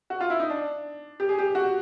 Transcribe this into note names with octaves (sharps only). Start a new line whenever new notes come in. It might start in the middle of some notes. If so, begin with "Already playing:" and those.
F#4
F4
E4
D#4
D4
G4
G#4
G4
F#4